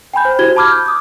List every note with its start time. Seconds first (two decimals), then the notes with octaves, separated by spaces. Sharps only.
0.14 G5 G#5 B5 G6
0.25 C5
0.39 E4 F#4 G4 C5 G#6 G7
0.56 A5 B5 D6 F6 G#6
0.72 G6
0.86 D6 D#6